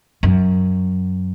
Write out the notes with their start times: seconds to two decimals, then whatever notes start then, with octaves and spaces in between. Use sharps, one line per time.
0.23 F#2